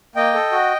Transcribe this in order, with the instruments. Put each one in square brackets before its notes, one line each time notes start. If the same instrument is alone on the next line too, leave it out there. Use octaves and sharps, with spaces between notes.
[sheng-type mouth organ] A#3 D#5 G5
A4
F#4